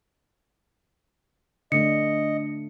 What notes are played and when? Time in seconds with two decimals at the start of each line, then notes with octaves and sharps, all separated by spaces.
1.72 D3 A3 D4 D#5 C#7